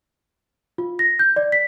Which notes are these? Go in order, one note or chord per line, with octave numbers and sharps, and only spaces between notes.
F4
A#6
G6
D5
B6